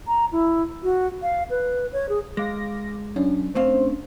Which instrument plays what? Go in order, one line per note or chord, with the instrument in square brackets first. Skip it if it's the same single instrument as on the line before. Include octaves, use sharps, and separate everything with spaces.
[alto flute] A#5
E4
F#4
F5
B4
C#5
G#4
[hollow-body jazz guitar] G#3 [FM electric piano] F5 D6 A#6
[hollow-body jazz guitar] F#2 [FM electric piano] C#4 D4
[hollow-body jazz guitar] A3 C4 F5 [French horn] C5